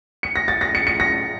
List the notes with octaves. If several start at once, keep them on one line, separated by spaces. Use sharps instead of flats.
C#7
A#6
A6
A#6
C#7
C#7
A#6